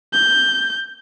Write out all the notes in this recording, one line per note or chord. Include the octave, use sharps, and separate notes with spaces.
G6